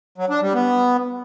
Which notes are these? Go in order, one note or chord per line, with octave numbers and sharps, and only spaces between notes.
F#3
D4
G3
B3